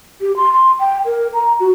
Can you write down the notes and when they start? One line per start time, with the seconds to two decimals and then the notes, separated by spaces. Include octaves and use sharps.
0.21 G4
0.36 C6
0.53 C6
0.80 G5
1.05 A#4
1.33 A#5
1.60 F#4